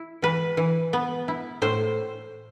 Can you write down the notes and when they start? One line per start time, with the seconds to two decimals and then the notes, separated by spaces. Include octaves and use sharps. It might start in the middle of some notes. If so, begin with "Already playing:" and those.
Already playing: E4
0.22 E3 B4
0.57 E3
0.93 B3
1.28 E4
1.62 A2 C5